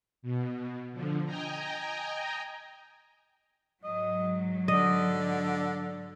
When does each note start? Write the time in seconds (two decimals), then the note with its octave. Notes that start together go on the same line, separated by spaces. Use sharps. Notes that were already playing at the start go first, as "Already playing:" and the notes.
0.22 B2
0.92 D3 F3
1.25 D#5 G5 G#5 A#5
3.84 G#2 F#3 D#5
4.68 D3 D5 D#5